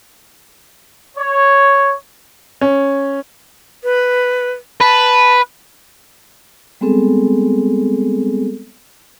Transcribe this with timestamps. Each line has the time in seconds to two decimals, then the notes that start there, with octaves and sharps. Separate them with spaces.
1.17 C#5
2.61 C#4
3.84 B4
4.81 B4 A5
6.81 G3 G#3 B3 C4 G#4 A4